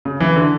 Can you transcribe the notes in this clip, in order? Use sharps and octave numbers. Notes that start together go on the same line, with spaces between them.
C#3
E3
D3